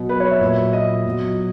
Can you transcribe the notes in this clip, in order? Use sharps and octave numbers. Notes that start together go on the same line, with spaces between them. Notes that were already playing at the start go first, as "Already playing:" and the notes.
Already playing: B2 F#3
B4
C#5
E5
A#2 F#3
D#5
B2 F#3